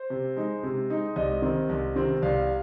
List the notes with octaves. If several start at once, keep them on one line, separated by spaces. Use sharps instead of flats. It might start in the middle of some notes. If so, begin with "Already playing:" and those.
Already playing: C5
C3
G#3 D#4
C3
G#3 D#4
C2 D#5
C3 D#3 C4
C2
C3 D#3 C4
C2 F5